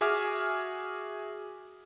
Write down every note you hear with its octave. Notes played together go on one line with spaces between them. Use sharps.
F#4 G#4 E5 G#5 D6 F6